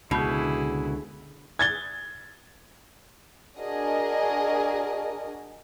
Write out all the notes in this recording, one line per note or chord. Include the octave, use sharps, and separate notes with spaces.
C#2 B2 D3 E4 G#4 G6
G#6 A6 G7
D4 F#4 G#4 A#4 D#5